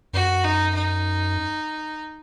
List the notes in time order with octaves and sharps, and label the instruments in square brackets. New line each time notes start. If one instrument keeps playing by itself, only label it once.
[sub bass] F#2 [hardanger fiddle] F#4
[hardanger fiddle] D#4
D#4